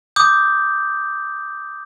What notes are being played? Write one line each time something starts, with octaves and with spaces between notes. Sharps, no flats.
D6 D#6 G6